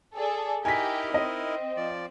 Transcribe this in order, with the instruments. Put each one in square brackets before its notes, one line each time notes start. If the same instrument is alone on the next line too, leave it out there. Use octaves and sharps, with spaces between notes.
[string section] G#4 A4 D5
[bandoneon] D#4 E4 A#4 [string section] G4 [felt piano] G#5 B6
[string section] C4 [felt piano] D#5
[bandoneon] F3 D5